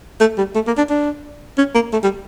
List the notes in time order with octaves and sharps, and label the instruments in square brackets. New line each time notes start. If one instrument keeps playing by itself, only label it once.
[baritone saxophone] A3
G3
A3
A#3
D4
D4
C#4
A#3
A3
G3